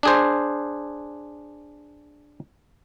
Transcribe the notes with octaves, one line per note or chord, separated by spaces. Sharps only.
D4 G#4 C5